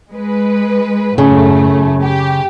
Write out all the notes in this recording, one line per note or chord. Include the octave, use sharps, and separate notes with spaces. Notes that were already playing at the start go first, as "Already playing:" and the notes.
G#3 B4
F#2 A2 C#3 A3
G4